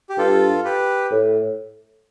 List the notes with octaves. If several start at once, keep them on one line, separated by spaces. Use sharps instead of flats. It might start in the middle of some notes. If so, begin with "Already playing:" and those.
G4
G2 F4 A4
G4 B4
A2